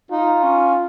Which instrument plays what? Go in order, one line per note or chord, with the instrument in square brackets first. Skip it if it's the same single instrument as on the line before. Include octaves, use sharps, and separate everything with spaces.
[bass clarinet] D#4 [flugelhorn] F4
[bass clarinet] C#4